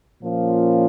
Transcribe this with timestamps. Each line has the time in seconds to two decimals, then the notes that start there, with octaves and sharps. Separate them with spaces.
0.23 A#2 F3 A#3 C#4 F4